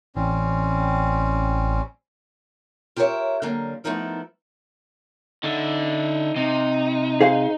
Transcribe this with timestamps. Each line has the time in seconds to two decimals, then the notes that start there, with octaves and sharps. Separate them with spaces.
0.15 A1 G3 C4 C#4
2.96 F4 G4 A#4 B4 C#5 E5
3.42 D3 F#3 G3 A#3
3.84 F3 A3 B3 D#4 E4 A#4
5.43 D3 D#4 E5
6.36 C3 D#4
7.21 G#4 C5 F5